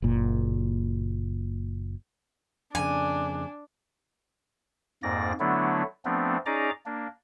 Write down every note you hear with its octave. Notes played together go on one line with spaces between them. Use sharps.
F#1 A#2
F2 C#3 D4 G#5
F2 G#2 A#3 D5 A#6
D3 F#3 A3 B3 D4 E4
F3 A3 B3 C4 D4
C#4 D#4 G#4 D5 A#5 D6
A#3 D4